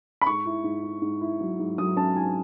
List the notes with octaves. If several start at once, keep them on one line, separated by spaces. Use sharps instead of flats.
B5
G#2 C#6
E4
G#2
E4
G#2
E4
F#3
G#2
F#3 D#6
C#4 A5
G#2 G#5